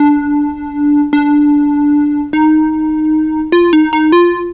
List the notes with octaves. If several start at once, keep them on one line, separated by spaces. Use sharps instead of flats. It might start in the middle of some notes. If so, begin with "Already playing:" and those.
Already playing: D4
D4
D#4
F4
D#4
D#4
F4